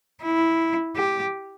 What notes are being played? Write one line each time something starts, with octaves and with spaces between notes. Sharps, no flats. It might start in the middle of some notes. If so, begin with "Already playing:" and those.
E4
G4